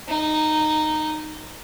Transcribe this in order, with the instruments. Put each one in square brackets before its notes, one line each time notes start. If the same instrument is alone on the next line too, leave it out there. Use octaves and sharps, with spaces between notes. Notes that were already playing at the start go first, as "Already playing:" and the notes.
[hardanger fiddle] D#4